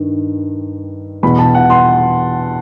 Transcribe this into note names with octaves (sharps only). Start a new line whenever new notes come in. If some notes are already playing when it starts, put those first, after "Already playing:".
Already playing: G2 D#3
E2 B2 B5
A5
F#5
C6